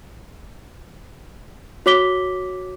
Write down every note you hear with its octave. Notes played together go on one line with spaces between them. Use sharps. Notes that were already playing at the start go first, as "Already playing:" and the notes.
F#4 C#5 D6 B6 G7